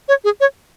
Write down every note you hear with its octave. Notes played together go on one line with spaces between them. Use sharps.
C#5
G#4
C#5